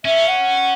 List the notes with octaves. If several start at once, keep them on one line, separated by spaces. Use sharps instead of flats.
C#4 E5
F#5